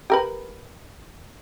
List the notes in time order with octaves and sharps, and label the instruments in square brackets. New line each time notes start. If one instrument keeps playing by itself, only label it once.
[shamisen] G4 A#4 B4